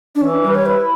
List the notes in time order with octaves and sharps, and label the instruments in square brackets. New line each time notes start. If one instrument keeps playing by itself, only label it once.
[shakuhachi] D4
[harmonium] E3 [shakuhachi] C#4
[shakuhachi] D4
[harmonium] G3 [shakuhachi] B4
[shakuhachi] C#5
[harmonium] E4 [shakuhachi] B4